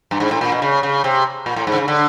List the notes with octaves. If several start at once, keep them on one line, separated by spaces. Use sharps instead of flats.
G2
G#2
A2
A#2
B2
C#3
C#3
C3
A#2
A2
G#2
D3
C#3
D3